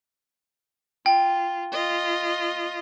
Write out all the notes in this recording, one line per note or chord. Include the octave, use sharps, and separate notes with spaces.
F4 G5
F4 D#5